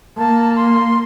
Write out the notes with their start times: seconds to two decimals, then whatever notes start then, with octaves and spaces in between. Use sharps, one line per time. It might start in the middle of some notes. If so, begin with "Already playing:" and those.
0.18 A#3 A5
0.56 C6